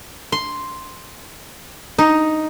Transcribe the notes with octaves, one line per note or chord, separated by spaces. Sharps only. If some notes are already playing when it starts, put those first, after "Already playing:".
C6
D#4